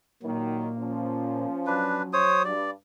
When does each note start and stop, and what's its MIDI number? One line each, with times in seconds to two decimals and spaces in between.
0.23 1.46 46
0.23 0.68 51
0.23 0.68 54
0.23 1.46 58
0.77 2.29 53
0.77 2.29 61
1.67 2.53 54
1.67 2.02 62
1.67 2.02 71
2.13 2.43 72
2.13 2.43 73
2.13 2.43 87
2.45 2.71 43
2.45 2.70 74